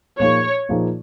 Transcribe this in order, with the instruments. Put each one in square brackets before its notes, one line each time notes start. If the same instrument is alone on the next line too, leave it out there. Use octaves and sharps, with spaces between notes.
[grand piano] A#2 F3 A#3 D#4 G#4 [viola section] C#5
[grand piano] A#2 F3 A#3 D#4 G#4